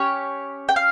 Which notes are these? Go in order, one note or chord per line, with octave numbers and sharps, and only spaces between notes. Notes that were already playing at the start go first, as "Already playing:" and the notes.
Already playing: C#4 G4 C#5
G5
F5